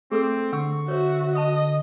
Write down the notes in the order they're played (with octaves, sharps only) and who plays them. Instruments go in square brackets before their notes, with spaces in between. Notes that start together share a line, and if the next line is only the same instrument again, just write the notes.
[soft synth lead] A3 [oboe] C4 [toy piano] G#4 A4 E6
[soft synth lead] D3 [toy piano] F#5 E6 [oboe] C#6
[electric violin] F#4 E5 [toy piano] C5 C#5
[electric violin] D#5 [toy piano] A5 B5 D#6